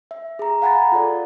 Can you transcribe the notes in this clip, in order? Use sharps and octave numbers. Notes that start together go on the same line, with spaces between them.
E5
G#4 A#5
F5 F#5 G#5 A#5 B5 A6
F4 A4 D5